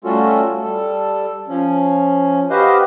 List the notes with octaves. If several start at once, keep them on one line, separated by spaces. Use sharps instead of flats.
G3 A3 C#4 F4 F#4 A4
G3 A4
F3 C#4
F#4 G4 B4 C5 D#5 F5